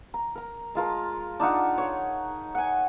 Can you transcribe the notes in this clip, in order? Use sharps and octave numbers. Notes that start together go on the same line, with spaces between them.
A#5
A#4 A#5
G#3 F4 A#4 A5
D4 D#4 F4 F#5
C#5 F#5
F#5 G#5